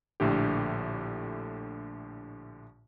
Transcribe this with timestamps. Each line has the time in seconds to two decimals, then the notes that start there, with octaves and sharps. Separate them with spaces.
0.20 A#1 A2 D3 G4